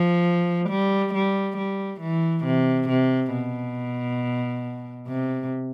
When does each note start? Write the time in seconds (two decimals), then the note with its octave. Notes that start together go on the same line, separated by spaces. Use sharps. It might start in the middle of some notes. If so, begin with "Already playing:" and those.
Already playing: F3
0.70 G3
1.15 G3
1.58 G3
2.01 E3
2.45 C3
2.89 C3
3.33 B2
5.08 C3